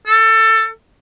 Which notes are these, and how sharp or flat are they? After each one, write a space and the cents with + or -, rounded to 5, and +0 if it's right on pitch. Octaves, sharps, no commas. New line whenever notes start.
A4 +20